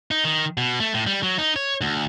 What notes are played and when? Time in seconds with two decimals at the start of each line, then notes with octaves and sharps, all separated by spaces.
0.11 D#4
0.25 D#3
0.58 B2
0.80 A3
0.94 A2
1.06 G3
1.23 F#3
1.38 D#4
1.56 C#5
1.81 D2